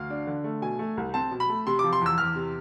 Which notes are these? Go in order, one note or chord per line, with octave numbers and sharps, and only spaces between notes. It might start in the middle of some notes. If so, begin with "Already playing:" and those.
Already playing: D2 F5
D4
D3
A3
B2 G#5
A3
C2
C4 A5
B2
B5
A3
C3 C6
D6
F3
C6
E2 E6
E2 F6
C3